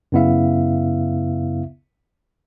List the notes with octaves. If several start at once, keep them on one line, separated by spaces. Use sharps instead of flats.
F#2 C#3 B3 E4 E5 F5